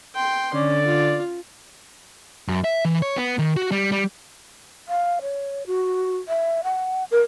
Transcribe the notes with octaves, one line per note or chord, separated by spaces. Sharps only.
G5 C6
D3 C#4 D5
F4
F#2
E5
E3
C#5
B3
D#3
F#4
G3
G3
F5
C#5
F#4
E5
F#5
A#4